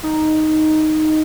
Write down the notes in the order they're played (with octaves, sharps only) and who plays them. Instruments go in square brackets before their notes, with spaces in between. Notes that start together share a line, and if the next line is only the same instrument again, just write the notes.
[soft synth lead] D#4